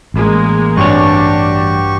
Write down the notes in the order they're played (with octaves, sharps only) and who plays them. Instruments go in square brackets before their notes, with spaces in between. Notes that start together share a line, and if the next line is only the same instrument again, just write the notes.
[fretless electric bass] A1 [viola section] G#3 A#3
[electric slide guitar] G2 C#5 [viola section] D4 [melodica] F#4 G4 C#6